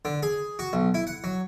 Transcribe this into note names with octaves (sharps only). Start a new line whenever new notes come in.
D3
G#4
F#4
B1
E4
F#5
F#3